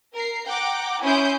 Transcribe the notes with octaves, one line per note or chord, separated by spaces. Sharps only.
A#4 A#5 C7
F#5 G5 A#5 D6
C#4 E4 G#5 C6 D#6 G6